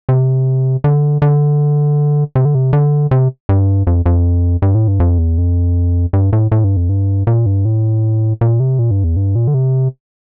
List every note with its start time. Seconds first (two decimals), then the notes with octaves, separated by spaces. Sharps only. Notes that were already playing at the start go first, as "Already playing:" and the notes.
0.09 C3
0.84 D3
1.22 D3
2.35 C3
2.45 D3
2.55 C3
2.73 D3
3.11 C3
3.49 G2
3.87 F2
4.06 F2
4.62 G2
4.75 A2
4.88 G2
5.00 F2
5.19 E2
5.38 F2
6.13 G2
6.33 A2
6.52 A2
6.64 G2
6.77 F2
6.89 G2
7.27 A#2
7.46 G2
7.65 A2
8.41 A#2
8.60 C3
8.79 A#2
8.91 G2
9.04 E2
9.16 G2
9.35 A#2
9.47 D3
9.54 C3